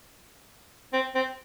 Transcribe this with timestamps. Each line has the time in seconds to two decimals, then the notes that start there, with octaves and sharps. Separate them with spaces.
0.93 C4
1.15 C4